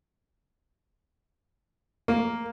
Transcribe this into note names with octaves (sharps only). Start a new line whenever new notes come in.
A#3